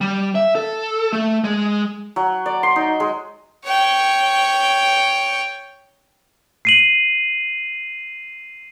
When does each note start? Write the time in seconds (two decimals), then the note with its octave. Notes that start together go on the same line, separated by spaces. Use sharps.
0.01 G3
0.35 E5
0.56 A4
1.13 A3
1.44 G#3
2.16 F#3
2.46 D5
2.63 C6
2.76 D#4
3.00 G#3
3.65 C#5 G5
6.65 C7 D#7 F#7